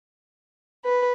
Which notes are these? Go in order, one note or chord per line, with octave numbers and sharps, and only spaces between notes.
B4